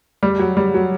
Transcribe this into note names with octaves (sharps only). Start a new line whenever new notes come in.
G3
F#3
G3
F#3